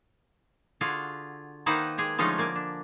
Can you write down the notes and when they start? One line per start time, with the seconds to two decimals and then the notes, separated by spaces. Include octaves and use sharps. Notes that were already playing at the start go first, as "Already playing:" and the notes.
0.81 D3 F4 F#4 G#4
1.66 D#3 A#3 D#4 B4 C5 F#5
1.98 G#3 G4 G#4
2.18 D3 F3 G#3 A3 C#4 D#4
2.38 A#3 D5 G#5
2.55 D4